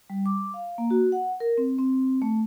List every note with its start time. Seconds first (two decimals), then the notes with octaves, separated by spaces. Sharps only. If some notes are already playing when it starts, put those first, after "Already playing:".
0.10 G3
0.26 D6
0.54 F5
0.78 A#3
0.90 F#4
1.12 F#5
1.40 A#4
1.58 C4
1.79 C4
2.22 A3